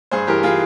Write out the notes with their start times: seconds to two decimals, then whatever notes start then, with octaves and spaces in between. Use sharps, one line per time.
0.11 G2 G#4 C5
0.27 E3 G4 A#4
0.43 E3 F4 G#4